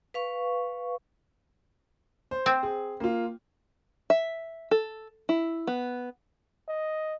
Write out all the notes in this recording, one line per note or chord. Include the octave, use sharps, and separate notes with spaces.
B4 F5 C#6
C5
C4
G#4
A#3 F4
E5
A4
E4
B3
D#5